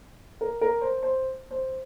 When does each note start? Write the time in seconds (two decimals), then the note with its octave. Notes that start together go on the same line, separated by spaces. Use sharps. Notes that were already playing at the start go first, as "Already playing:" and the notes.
0.41 A#4
0.61 A#4
0.81 C5
1.03 C5
1.51 C5